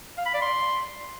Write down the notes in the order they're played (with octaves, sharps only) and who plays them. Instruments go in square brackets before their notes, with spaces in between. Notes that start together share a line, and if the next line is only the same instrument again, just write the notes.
[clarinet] F5
B5
D5
C6